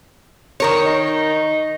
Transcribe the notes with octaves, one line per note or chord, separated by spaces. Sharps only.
D#3 A#4 C#5
D#4